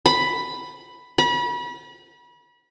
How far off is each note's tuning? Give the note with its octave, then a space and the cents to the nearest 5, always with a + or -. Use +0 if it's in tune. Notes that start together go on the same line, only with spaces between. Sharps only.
B5 +5
B5 -35